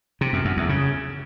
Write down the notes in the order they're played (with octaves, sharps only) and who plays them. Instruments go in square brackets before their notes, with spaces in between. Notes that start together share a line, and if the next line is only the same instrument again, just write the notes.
[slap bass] C3
F#2
F#2
E2
C#3